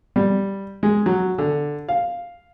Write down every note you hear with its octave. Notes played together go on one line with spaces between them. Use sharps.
G3
G#3
F#3
D3
F5